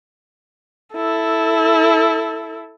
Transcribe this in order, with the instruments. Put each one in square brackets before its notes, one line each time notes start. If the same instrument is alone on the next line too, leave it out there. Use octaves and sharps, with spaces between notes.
[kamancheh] E4 A4